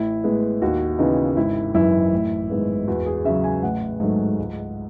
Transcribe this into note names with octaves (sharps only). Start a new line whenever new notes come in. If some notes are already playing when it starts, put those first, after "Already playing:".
Already playing: A1 E4
A2 G#3 B3
D#2 F#4
C#3 E3 B3 D#4
G#1 E4
F#2 E3 E4
A1
G#2 D#3 G#3 B3
E2 F#4
G#4
C#3 F#3 E5
G#5
A1 F#5
G#2 F#3 A3
C#2